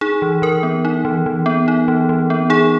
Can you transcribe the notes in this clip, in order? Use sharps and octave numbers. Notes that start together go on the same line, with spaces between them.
D#4 G#4
E3
E3 A#4
B3
D#4
E3
E3
B3
D#4
E3
E3
B3
D#4 G#4